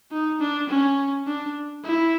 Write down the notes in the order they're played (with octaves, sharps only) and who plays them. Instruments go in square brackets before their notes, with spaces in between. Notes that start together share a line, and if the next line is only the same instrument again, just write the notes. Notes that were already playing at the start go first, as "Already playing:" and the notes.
[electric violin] D#4
D4
C#4
D4
E4